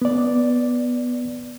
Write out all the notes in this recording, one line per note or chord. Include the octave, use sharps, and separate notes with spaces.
B3 D5